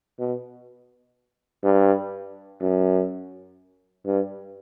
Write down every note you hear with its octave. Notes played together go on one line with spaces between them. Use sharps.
B2
G2
F#2
G2